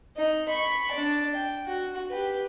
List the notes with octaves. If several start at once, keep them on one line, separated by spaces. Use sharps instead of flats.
D#4
B5 C#6
D4 D5
G5
F#4
G4 B4